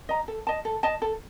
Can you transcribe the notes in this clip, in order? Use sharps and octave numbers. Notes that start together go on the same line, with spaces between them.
D#5 A#5
A4
D#5 A5
A4
D#5 A5
A4